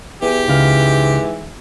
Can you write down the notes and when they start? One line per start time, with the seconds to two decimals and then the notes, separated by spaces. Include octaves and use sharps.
0.22 E2 E3 G4
0.48 C#2 G#2 E3 F5